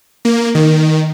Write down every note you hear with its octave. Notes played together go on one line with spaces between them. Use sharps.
A#3
D#3